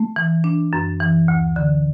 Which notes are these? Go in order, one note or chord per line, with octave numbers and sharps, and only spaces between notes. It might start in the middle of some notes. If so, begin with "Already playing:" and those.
Already playing: A3
E3
D4
F#2
E3
D2
D3